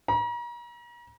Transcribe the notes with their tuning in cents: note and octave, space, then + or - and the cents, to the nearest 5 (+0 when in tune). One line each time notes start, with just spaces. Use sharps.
A#5 +40